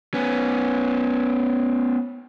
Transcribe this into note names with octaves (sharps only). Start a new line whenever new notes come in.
B3 C#4